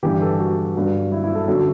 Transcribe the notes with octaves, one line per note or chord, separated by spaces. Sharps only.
G2 E3 G4
A4
F#4
G2 F#3
E4
E4
A4
F#2 D3 F#3 A4